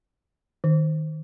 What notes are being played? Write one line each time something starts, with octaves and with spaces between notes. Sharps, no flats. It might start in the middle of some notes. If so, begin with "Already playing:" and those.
D#3